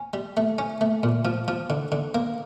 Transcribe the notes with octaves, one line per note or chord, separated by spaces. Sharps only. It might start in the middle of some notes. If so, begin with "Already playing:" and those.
Already playing: C#4
G3
A3
C#4
A3
A#2
F3
F3
D3
D3
A#3